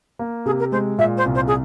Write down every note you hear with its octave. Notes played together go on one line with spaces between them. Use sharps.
A#3
C3 G#4
A#4
G#3 C5
A#2 E5
C5
C2
C5
G#4